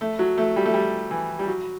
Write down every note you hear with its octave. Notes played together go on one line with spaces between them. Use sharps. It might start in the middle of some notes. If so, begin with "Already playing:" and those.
A3
F#3
A3
G3
A3
G3
E3
G3
F#3